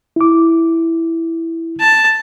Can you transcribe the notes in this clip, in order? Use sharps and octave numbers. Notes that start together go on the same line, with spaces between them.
E4 D6
A5